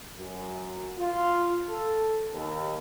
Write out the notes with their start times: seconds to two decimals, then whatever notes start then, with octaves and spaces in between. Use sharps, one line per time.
0.16 F#2
0.98 F4
1.68 A4
2.32 D#2